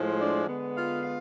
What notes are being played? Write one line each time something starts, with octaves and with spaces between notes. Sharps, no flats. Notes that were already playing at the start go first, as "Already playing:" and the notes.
Already playing: A2 F3 G#3
D4 D5
D3 G#3 B3
F4 F5
F4 F5